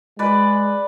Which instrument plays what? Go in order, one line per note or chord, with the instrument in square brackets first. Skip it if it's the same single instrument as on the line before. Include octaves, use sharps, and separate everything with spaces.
[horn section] G#3 [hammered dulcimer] B4 D5